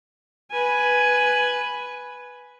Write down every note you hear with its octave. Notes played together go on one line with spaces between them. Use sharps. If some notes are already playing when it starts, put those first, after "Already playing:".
B4 G#5